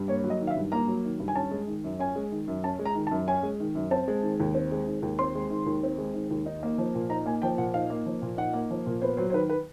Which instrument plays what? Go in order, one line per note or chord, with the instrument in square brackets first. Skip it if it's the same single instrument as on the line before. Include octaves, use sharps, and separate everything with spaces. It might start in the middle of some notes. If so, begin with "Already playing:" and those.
Already playing: [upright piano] G2
A#3 C#5
F#3
D#5
D#3
F5
E5
G2
A#3 A#5
F#3
D#3
G2
G#5
C#4 A5
G#3
D#3
F#2
C#4 G#5
G#3
D#3
F#2
C#4 A5
G#3
A#5
D#3
A5
F#2
C#4 G#5
G#3
D#3
F#2
C4 A5
G#3
D#3
D#2
C4
G#3
D#3
D#2
C4 C6
G#3
D#3
D#2
C4
G#3
D#3
D#2
D#4
A#3
F3
A#2
D#4 A#5
A#3 G#5
F3 G5
A#2 F#5
D#4 F5
A#3
F3
A#2
D#4 F#5
A#3
F3
A#2
B3 C5
F#3 C5
C5
D#3 B4
B4